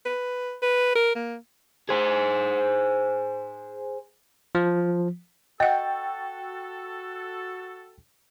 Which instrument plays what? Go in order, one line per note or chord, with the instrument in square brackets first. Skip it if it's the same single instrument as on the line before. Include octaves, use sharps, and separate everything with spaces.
[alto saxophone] B4
B4
A#4
A#3
[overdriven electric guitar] G#4 C5
[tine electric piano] F3
[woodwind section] F#4 A4 [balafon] D#5 F#5 [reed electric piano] G5